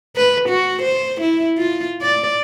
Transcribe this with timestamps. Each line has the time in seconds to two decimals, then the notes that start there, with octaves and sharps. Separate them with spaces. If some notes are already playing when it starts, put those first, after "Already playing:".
0.16 B4
0.49 F#4
0.82 C5
1.21 E4
1.58 F4
2.02 D5